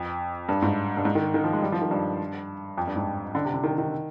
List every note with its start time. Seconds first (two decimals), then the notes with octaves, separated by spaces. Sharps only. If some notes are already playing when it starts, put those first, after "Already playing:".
Already playing: F2
0.49 G2
0.62 G#2
0.97 G2
1.05 G#2
1.15 D#3
1.34 D#3
1.44 F3
1.53 G#3
1.62 G3
1.72 F3
1.82 D#3
1.91 G2
2.78 F2
2.87 G2
2.96 G#2
3.35 D3
3.45 C3
3.54 D3
3.64 D#3
3.78 D#3